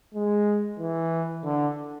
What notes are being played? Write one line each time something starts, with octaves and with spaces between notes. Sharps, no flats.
G#3
E3
D3